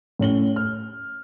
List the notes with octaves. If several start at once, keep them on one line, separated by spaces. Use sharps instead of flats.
A2 C#4 F#7 G7
F6